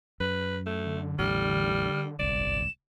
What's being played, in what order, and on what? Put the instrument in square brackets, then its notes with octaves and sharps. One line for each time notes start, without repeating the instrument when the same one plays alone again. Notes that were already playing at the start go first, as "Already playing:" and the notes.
[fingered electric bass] F#2 [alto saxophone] B4
[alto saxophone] A3
[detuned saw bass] D3
[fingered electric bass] A1 E2 A2 [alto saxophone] G3 [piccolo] F6
[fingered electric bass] D1 C2 [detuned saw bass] G1 [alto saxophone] D5 [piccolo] E7